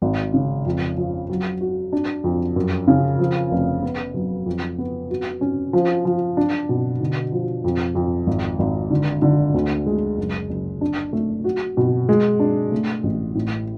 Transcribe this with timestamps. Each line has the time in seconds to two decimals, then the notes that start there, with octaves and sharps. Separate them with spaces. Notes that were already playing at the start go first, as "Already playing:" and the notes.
0.02 G#1
0.34 C#3
0.66 F2
0.98 F3
1.30 F#3
1.61 F#4
1.93 D4
2.24 F2
2.56 F#2
2.88 C#3
3.19 F3
3.51 F1
3.83 B3
4.14 F#3
4.46 F2
4.78 B3
5.10 F#4
5.41 C#4
5.73 F3
6.05 F3
6.37 D4
6.69 B2
7.01 D3
7.32 F3
7.64 F2
7.95 F2
8.27 G#1
8.59 G#1
8.91 D3
9.22 D3
9.54 D2
9.86 G#3
10.18 F#1
10.50 F#1
10.81 D4
11.13 A3
11.44 F#4
11.77 B2
12.09 G#3
12.40 D4
12.72 A3
13.03 A1
13.35 A2